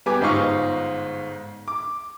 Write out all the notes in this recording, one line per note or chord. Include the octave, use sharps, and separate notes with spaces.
G3 B3 G4 G#5 D6
G1 G#2 D#4 F4 F5 C#6
D6